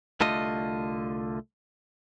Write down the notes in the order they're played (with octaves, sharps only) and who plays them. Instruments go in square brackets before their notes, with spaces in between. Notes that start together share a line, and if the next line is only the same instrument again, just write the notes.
[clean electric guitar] C2 D3 A3 F4 D#5